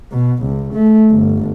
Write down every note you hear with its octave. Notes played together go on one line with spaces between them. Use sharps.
B2
C#2
A3
G1